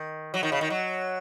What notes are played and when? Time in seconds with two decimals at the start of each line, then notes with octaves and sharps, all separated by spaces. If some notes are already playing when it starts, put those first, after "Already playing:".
Already playing: D#3
0.34 F#3
0.43 D#3
0.52 C#3
0.61 D#3
0.70 F#3